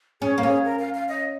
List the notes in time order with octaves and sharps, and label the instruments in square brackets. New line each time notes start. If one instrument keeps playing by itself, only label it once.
[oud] C#4 [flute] G#4
[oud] A#3
[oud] C#4 [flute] G#4
[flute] A#4
F5
F5
D#5